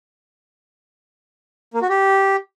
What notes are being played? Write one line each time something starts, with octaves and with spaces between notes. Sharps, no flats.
A#3
F#4
G4